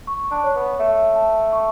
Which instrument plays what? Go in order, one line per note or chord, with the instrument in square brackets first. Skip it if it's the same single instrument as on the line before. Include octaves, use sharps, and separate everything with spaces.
[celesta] C#6
[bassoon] D4
[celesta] C#5
[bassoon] B3
[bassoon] A3 [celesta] E5
[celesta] A5
C#6